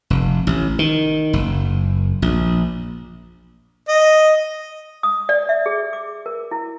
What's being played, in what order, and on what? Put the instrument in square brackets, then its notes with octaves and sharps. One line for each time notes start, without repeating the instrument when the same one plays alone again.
[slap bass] F1
A1
D#3
F#1
A#1
[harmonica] D#5
[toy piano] D#6
D5
E5
G#4
D6
A#4
E4